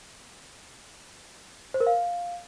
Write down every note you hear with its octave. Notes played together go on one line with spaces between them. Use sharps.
C5
A#4
F5